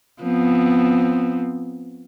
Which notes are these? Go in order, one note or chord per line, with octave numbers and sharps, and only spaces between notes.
F3 B3 C4